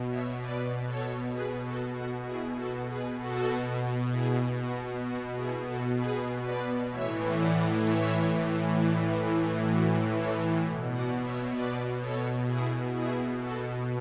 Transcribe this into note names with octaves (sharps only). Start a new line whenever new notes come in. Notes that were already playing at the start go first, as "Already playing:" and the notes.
Already playing: B2
C#5 E5
B4 D5
A4 C#5
G#4 B4
F#4 A4
F#4
E4 G#4
F#4 A4
G#4 B4
B2 F#4 A4
E4 G#4
F#4
F#4
E4 G#4
F#4 A4
G#4 B4
B4 D5
A2 E3 C#5 E5
D5 F#5
C#5 E5
B4 D5
E4
E4
F#4
A4 C#5
B2
D5 F#5
C#5 E5
B4 D5
A4 C#5
E4 G#4
E4 G#4
F#4 A4